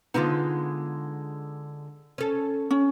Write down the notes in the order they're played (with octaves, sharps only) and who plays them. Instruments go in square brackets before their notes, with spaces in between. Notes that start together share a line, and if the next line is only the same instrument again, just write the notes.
[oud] D3 G#3 B3 [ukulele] D#4 F4
[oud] C#4 A4
[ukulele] C#4